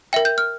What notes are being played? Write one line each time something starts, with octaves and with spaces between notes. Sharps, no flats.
A#4 E5 G5
G6
F6